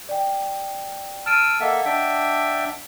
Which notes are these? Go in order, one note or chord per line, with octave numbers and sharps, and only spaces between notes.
D5 G5
A5 E6 F6 D7 D#7
A#3 A4 D#5 E5 F#5
D4 E5 G5